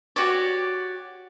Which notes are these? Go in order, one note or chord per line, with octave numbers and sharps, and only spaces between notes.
F#4 G4 C#5 D5